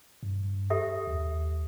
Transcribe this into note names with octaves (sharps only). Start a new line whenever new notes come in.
G2
G4 A4 E5
D#2